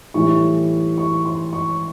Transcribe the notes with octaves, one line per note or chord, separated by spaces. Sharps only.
A2 E3 G3 C#6
C#6
C6
C#6